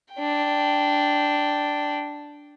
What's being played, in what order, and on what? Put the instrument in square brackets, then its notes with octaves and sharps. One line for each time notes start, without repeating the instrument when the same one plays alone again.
[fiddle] D4 G5